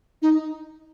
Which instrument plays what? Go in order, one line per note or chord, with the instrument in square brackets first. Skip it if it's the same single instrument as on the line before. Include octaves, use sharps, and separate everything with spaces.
[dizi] D#4